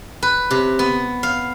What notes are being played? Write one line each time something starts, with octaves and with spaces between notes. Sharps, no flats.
B4
C3
B3
F5